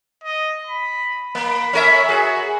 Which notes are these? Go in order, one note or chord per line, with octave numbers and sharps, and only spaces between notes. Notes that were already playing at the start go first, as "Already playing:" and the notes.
D#5
B5
A#3 B5
C#4 A#4 E5
F#4 G#4